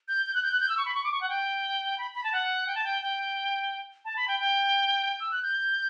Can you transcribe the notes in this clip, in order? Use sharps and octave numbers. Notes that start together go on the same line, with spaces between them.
G6
G6
F#6
G6
F#6
G6
E6
C#6
B5
C#6
D6
C#6
F#5
G5
B5
B5
A5
F#5
G5
A5
G5
G5
A5
B5
G5
G5
E6
F#6
G6